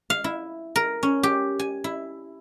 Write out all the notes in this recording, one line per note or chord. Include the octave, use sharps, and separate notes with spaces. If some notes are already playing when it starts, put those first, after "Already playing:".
F5
E4
A#4
C#4
G4
G#5
E4